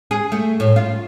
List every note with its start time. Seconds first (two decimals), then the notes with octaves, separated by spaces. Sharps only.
0.11 G#4
0.32 A3
0.60 A2
0.76 F4